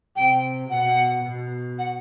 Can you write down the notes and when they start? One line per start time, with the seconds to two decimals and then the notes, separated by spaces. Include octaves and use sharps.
0.16 C3 G5
0.70 B2 F#5
1.24 B2
1.79 F#5